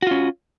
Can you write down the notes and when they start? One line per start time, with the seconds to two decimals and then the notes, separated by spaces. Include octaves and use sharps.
0.02 F#4
0.07 F4
0.11 C#4